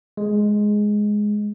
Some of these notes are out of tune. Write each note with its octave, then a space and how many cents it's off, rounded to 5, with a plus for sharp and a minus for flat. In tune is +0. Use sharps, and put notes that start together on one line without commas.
G#3 +5